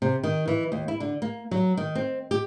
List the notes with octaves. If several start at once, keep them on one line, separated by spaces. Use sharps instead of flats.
C3
D#3
E3
D#2
E4
D3
A#3
F#3
D#3
C4
G4